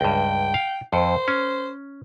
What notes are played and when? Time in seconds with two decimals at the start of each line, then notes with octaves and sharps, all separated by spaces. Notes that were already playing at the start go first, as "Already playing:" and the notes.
0.01 C#2 G2 G5
0.54 F5
0.93 F2 C5
1.28 C#4